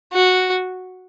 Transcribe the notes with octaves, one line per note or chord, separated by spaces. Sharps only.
F#4